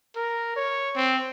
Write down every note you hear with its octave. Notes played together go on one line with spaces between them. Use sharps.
A#4
C#5
C4